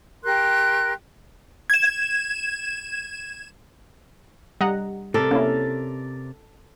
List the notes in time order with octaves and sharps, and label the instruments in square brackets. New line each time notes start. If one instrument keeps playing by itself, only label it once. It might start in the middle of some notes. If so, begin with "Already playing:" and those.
[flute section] G4 A#4 C6 F#6
[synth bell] G#6 E7
[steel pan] G3 [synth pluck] D#5 F#5 A#5
[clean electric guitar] C3 A#4 D5 [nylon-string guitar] A4
[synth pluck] A#3 E4 [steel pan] C#4